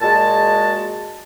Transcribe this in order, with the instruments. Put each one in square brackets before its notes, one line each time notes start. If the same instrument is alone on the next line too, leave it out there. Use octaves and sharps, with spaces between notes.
[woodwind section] A#2 G#3 F#4 A5